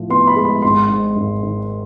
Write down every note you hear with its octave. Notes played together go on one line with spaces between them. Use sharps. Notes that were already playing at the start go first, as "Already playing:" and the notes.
Already playing: A2 F3
B3 C6
B5
G#3
B5
G#1 C6
G#2
G#1
D#3